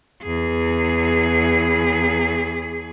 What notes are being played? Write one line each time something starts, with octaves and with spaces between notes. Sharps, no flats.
E2 G#4